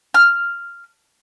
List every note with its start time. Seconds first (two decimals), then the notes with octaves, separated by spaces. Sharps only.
0.14 F6